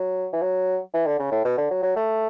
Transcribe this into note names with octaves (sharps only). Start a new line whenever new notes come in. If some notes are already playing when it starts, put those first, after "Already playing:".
Already playing: F#3
E3
F#3
E3
D3
C#3
A2
B2
D3
F#3
F#3
A3